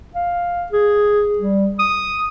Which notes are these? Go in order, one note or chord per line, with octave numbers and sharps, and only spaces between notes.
F5
G#4
G3
D#6